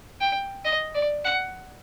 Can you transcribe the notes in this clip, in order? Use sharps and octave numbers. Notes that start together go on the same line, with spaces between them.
G5
D#5
D5
F#5